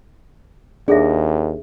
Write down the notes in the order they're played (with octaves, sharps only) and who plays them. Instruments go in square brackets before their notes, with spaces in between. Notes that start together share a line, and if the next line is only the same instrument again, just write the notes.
[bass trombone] D#2 [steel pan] D4 [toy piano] G#4 A4 E5